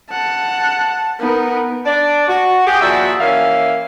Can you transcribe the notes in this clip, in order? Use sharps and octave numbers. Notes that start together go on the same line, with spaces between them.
F#5 A5
B3 D#4 A#4
D4 D5
F#4
G4 G#4
D#2 F3 F#4 G#4 D5 E5
E3 A#3 C#4 E5 F5